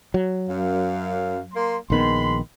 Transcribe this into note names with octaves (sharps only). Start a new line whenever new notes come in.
F#3
F#2 F5
A#3 C6
A#1 D#3 G#3 B3 B5 C6